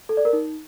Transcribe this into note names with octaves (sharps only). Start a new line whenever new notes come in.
A4
D5
A#4
D#4